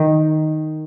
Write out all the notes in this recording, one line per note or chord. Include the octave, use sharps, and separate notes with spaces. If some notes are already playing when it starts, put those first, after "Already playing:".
Already playing: D#3